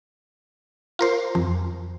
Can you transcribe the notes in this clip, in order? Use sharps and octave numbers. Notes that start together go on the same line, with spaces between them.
F4 A#4 C5
F2